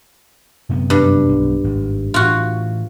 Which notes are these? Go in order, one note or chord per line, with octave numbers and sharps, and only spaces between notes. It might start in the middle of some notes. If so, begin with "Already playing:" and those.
F#2 C3 B3
G2
B1
G#1
A2 E3 F4 F#4